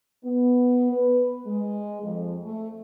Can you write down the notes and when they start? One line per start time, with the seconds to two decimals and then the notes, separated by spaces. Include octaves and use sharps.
0.24 B3
0.93 B4
1.46 G#3
2.03 F2
2.43 A3